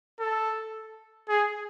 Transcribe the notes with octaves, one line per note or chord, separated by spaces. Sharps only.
A4
G#4